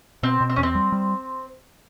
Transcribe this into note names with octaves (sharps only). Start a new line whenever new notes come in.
B2 C4
B2
C4
E2 C#4
C4
G3
G3